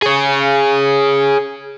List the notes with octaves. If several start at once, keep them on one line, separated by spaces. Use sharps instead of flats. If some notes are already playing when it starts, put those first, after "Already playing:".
G#4 C#5